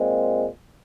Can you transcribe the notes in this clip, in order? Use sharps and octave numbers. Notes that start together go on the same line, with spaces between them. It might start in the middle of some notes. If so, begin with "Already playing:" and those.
Already playing: A#2 G#3 C4